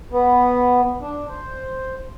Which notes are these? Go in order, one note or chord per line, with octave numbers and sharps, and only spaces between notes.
B3
D4
C5